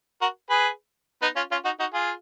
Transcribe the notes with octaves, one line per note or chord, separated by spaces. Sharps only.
F#4 A#4
G#4 B4
B3 D#4
C#4 F4
C#4 F4
D#4 F#4
D#4 F#4
F4 G#4